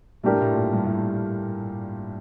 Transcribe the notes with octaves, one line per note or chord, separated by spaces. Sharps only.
A2 G3 D4 G4 A#4
G2
A2
A#2
G2
A2